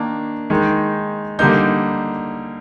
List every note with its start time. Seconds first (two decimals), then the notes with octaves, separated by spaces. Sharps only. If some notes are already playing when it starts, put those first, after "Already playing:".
Already playing: D#3 A#3 D4
0.50 D#3 G#3 D#4
1.39 D3 G3 A#3 D#4 G6